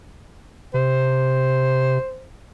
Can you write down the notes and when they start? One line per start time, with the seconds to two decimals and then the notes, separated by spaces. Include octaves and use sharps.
0.74 C3 C5